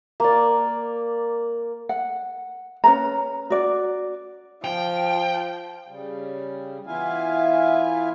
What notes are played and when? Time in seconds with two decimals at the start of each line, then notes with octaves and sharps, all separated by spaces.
0.20 A#3 D5
1.89 F#5
2.84 C#4 B4 A#5
3.50 F#4 D5
4.64 F3 G5
5.88 C#3 G3
6.86 E3 B3 E4 F4 F5 G#5